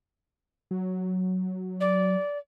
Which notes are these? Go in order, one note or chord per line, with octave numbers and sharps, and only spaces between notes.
F#3
D5